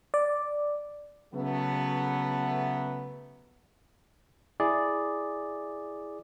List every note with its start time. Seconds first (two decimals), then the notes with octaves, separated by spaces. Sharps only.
0.14 D5
1.34 C#3 F#3 A3 B3
4.60 E4 G#4 D5